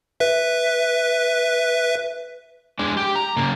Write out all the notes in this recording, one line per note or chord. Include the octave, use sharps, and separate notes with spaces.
B4 E5
G#3 D4
G4
A#5
C#3 A#3